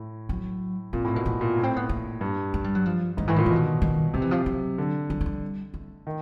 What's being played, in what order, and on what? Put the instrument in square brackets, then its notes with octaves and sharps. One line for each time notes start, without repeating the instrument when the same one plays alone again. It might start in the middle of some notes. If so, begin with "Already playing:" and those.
Already playing: [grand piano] A2
[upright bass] F#3
[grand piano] A#2 [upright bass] C4
[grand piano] A2
[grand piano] B2 [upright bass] A#3
[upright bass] B3
[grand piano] A#2
A2
[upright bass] C4
B3
A#3
[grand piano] G2
[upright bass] A3
G3
F#3
F3
[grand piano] G#2 [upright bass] D#3
[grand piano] A2 [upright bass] E3
[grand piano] A#2 [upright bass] D#3
[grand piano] B2 [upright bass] E3
[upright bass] D#3
D#3
[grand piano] C3 [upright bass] F3
[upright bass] E3
F3
F#3
[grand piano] D3
[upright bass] F#3
F#3
G3
A3
[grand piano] D#3